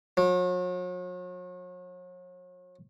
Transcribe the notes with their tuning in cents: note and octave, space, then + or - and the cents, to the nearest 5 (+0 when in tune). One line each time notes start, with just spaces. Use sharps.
F#3 -40